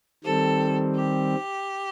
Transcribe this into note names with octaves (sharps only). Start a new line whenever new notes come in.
D#3 G3 C4 A4
G4